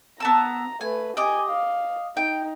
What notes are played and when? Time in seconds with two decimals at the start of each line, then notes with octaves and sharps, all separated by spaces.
0.20 B3 A5 A#5 E6
0.81 A3 B4 G#5
1.17 G4 D#5 G#5 D6
1.49 F5
2.17 D#4 G5